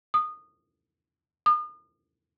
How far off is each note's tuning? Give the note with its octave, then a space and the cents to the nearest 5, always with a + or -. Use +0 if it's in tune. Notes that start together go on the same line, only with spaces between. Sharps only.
D#6 -20
D#6 -40